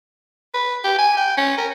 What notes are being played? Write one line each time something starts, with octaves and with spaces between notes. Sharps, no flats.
B4
G4
G#5
G5
C#4
A#4